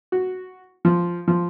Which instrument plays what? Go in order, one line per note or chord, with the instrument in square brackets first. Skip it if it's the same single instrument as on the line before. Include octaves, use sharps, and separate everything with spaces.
[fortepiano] F#4
F3
F3